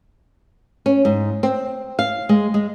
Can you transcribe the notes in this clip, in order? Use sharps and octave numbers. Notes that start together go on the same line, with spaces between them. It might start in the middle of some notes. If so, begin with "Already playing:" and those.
C#4
G#2
C4
F5
G#3
G#3